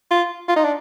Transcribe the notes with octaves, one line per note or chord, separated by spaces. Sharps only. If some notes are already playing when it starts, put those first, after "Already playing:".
F4
F4
D#4
D4